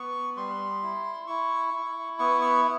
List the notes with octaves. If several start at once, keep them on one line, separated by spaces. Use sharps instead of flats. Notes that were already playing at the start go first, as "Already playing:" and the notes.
Already playing: B3 C#6
G3 C6
E4
E4 C#6
E4
B3 C#6
C#6